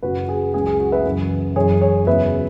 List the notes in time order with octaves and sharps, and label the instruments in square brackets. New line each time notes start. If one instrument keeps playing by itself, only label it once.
[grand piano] F#2 C#3 F#3 F#4 B4
G#4
C#2 C#3 F#3 G#4
G#4
F#4
B4 E5
F#2 C#3 E3
F#2 E3 G#3 G#4 C#5
G#4 C#5
E2 C#3 F#3 B4 E5